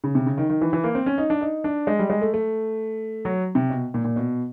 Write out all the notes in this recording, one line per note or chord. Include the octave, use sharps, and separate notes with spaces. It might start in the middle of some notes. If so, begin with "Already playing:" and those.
C#3
C3
C#3
D#3
D#3
E3
E3
A#3
C4
C#4
D#4
D4
D#4
D4
G#3
G3
G#3
A3
A3
F#3
C3
B2
A#2
A#2
B2